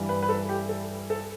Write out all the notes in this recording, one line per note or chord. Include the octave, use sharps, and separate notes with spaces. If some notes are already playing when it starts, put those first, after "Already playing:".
Already playing: G2 E3 G3
B4
B4
A4
G4
A4
A4